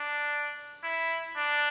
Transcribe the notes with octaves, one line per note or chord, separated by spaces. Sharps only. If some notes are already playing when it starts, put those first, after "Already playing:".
Already playing: D4
E4
D4